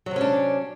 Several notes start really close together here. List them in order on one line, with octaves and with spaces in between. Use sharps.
F#3 C3 C#4 D4